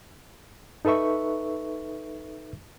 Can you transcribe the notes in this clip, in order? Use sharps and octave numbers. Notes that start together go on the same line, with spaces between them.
D#4 A4 B4 E5 C#6